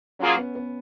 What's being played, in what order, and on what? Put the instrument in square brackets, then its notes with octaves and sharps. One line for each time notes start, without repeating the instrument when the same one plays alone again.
[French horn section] F#3 A#3 F4 G#4 [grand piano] C#4
[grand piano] B3
B3